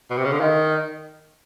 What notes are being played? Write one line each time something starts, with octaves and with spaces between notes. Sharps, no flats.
B2
C3
C#3
D3
D#3 D#5 F5